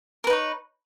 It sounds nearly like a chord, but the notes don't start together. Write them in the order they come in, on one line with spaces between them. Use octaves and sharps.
A#4 B4 D#4 C#5